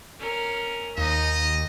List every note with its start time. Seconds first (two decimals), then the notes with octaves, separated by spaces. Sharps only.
0.19 C#4 A#4
0.98 D#2 D#4 D#5